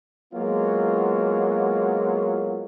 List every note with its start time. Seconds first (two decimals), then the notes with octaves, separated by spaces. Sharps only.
0.34 F#3 G#3 A#3 B3 F4 F#4